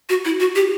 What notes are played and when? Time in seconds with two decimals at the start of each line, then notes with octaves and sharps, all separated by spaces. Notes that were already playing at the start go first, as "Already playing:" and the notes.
0.09 F#4
0.25 E4
0.40 F#4
0.56 G4